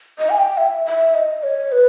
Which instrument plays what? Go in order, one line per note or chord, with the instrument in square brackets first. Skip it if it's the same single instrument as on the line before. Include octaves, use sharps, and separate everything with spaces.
[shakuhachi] D#5
G#5
G5
E5
E5
D#5
C#5
B4